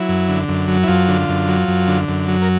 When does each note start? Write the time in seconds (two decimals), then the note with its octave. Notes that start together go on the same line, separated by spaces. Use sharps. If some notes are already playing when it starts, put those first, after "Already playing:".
Already playing: F#3 E4
0.09 F#2
0.28 D3
0.48 F#2
0.68 F#3
0.83 E4
0.88 F#2 F4
1.08 D3
1.29 F#2
1.48 F#3
1.68 F#2
1.88 D3
2.09 F#2
2.28 F#3
2.42 A#4